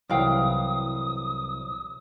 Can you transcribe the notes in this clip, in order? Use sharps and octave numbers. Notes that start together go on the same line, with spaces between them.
C2 E3 F#3 E4 F5 G5 D#6